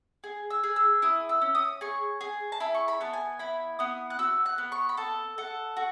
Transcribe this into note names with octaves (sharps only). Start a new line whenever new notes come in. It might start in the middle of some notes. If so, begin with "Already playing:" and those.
G#4
E6
G#4
E6
E4 D#6
E6
C#4
D#6
G#4 C#6
G#4
A5
E4 B5
C#6
B5
B3 A5
G#5
E4 B5
B3 D#6
F#6
F#4 E6
F#6
B3
C#6
B5
A4 A5
A4 F#5
F#4